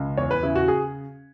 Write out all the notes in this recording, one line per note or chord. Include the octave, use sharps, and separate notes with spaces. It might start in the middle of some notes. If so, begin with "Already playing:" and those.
Already playing: C#2
E2 C#5
B4
C#3 E4
F#4
G#4